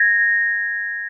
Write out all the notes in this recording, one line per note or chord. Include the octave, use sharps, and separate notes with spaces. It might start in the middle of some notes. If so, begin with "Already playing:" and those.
Already playing: G#6 A#6